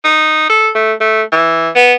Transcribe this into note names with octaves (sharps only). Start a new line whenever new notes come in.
D#4
A4
A3
A3
E3
B3